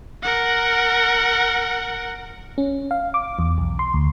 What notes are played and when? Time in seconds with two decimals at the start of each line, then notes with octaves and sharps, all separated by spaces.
0.22 A#4 F#5
2.58 C#4
2.91 F5
3.14 D6
3.39 E2
3.58 B1
3.79 C6
3.94 D2